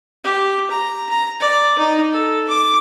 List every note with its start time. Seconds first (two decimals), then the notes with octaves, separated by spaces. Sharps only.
0.24 G4
0.70 A#5
1.09 A#5
1.40 D5
1.78 D#4
2.12 A4
2.48 D6